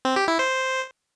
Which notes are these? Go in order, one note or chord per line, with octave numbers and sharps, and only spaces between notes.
C4
G4
E4
C5